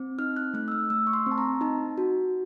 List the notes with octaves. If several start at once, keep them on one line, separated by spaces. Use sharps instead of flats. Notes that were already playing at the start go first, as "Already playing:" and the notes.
Already playing: C4
D#4 F6
F#6
A3 F#6
E6
F6
A3 E6
C#6
C6
C4
A5
A#5
D#4 A5
F#4